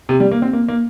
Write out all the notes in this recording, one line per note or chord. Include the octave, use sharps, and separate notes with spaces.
C3
G3
A#3
C4
A#3
A#3